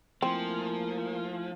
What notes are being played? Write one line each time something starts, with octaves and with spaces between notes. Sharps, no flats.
F3 A3 A#3 C4 E4 G#5